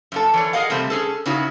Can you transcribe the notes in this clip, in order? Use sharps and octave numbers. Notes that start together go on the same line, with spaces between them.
F#2 A#3 A4
E3 C#5 D5
G#4 A#4 D#5 F5 F#5
C3 G3 A3 C4
C#4 G#4 A4
C#3 C#4 D#4 E4 F#4